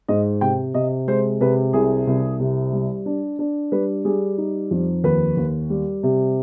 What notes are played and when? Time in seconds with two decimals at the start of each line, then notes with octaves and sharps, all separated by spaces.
0.08 G#2 D#5
0.41 C3 G5
0.74 C3 D#5
1.08 G#3 C5
1.41 C3 B4
1.73 C2 G#4
2.07 C2
2.40 C3
2.73 G3
3.06 D4
3.39 D4
3.72 G3 B4
4.05 G3 G#4
4.38 D#4
4.71 F2
5.04 D#2 B4
5.37 D#2
5.70 G3
6.03 C3